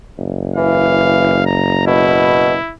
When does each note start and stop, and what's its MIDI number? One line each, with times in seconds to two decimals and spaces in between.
0.17 2.57 30
0.56 1.42 52
0.56 1.43 77
1.46 1.83 82
1.87 2.54 47
1.87 2.74 64